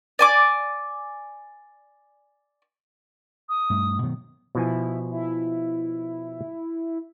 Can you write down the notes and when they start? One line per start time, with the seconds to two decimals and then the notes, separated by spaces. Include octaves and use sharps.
0.19 D5 G#5 D6
3.49 D#6
3.70 G2 A3
4.03 B2 D#3 F#3
4.55 B2 F3 E4 G#5
5.10 E4